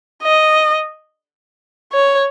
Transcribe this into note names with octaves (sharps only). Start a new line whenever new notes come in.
D#5
C#5